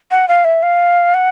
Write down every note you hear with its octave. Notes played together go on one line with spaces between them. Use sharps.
F#5
F5
E5
F5
F#5